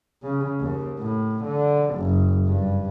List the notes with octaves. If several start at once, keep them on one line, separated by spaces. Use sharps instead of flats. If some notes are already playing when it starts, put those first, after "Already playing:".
C#3
D#2
A2
D3
F#1
G2